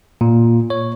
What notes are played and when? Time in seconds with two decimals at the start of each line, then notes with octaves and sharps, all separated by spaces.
0.21 A#2
0.70 C#5